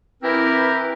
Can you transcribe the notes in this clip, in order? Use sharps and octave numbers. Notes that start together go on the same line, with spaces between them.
E3 C4 E4 G4 A#4 B4